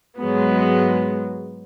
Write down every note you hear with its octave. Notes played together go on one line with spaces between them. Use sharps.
G#2 F#3 G#3 B3